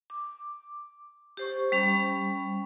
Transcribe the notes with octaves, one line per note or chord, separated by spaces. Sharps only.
D6
G4 C5 C#6
G3 C#4 B5